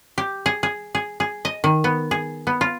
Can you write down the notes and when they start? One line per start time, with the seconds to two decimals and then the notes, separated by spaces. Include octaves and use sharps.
0.18 G4
0.46 G#4
0.63 G#4
0.95 G#4
1.20 G#4
1.45 D#5
1.64 D#3
1.84 B3
2.11 G#4
2.47 B3
2.61 F4